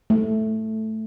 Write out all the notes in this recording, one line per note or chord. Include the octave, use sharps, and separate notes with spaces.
A3